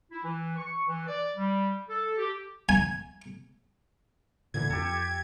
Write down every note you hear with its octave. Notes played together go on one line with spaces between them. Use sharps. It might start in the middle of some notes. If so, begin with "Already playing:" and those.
E4
E3
C#6
E3
D5
G3
A4
G4
G#5
A#2 D3 E3 G#6
F2 G4 A4